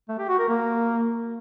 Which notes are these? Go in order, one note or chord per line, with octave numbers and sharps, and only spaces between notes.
A3
G4
F#4
A#4
A#3